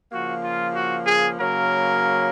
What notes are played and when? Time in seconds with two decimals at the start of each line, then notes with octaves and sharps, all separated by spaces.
0.12 C#3 F3 A#3 F#4
0.44 F4
0.75 F#4
1.07 G#4
1.39 C#3 F#3 A#3 A#4